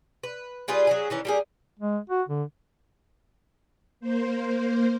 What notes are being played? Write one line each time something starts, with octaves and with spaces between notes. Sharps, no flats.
B4
G3 F4 G#4 B4
F#3 C#4 G#4
D#3 E3 C#4
G3 A#3 G#4
G#3
F#4
D3
A#3 C5